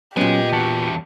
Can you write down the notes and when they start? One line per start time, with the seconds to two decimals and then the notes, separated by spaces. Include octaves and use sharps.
0.17 A#2 F#3 B3 C#4 G4 D#5 G#5
0.53 E2 F#4 A5